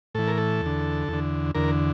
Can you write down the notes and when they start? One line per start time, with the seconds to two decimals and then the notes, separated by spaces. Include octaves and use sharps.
0.15 A2 E3 A4
0.27 A#4
0.38 A4
0.62 E2 D3
1.08 E2
1.13 D3
1.55 E2 D3 A#4